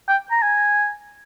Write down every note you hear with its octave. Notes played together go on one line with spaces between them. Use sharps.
G5
A#5
G#5